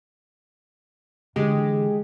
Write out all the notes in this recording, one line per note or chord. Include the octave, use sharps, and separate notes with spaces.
D3 E3 G#3 G4